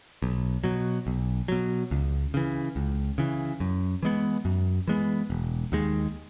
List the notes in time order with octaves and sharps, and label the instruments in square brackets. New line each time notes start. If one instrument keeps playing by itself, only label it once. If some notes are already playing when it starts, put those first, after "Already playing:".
[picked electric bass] B1
B2 F#3
B1
B2 F#3
C#2
C#3 E3
C#2
C#3 E3
F#2
E3 G#3 B3
F#2
E3 G#3 B3
E1
D#2 D#3 G#3